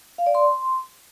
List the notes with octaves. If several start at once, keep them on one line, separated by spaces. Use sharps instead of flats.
F5
D5
C6